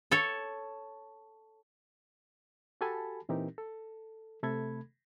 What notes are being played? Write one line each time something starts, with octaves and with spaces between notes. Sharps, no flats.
A4 C#5
F#4 G4 A4 G#5 A5 B5
A#2 E3 C4 D#4 G4 A#4
A4
C3 A3 A4 B5 G#6